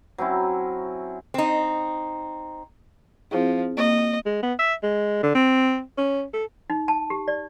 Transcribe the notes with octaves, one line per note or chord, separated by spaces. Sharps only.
F#3 C4 C#4 E4
C4 D#4
F3 C4 E4 G#4
A#3 D#5
G#3
B3
E5
G#3
D3
C4
C#4
A4
D#4
A5
G4
D5